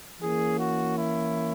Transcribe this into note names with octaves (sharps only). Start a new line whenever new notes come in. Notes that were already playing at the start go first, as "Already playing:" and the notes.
E3 A#3 C#4 G#4
F#4
E4